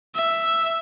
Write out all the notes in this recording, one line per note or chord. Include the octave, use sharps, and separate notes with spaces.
E5